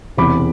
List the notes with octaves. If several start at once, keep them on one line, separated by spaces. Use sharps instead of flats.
E1 E2 C3 E3 B5 D6